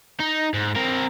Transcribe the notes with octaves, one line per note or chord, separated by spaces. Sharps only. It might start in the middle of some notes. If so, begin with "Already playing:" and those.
D#4
G#2
C4 A#4